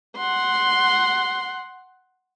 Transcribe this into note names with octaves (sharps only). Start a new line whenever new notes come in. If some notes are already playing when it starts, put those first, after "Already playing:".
F#5 C6